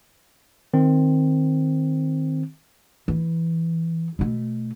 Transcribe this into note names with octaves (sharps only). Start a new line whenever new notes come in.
D#3 C4
E3
B2 A3